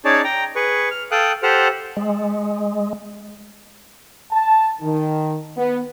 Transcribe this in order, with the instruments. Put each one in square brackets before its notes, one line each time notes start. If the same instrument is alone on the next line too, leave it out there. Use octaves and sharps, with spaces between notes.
[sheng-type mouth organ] C#4 D#4 G#4 C#5 D5 A5
G5 A#5
G#4 B4 C#6
F6
A4 F5 G5 D#6 F#6
G4 A4 C5 F#5 F6
[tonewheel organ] G#3
[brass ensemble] A5
D#3
B3